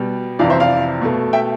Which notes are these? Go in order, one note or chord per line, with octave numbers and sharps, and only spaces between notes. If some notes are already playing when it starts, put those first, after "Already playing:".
Already playing: B2 G3
F2 C3 E3 D5 F5
C5 E5
D5 F5
B2 A3
E5 G5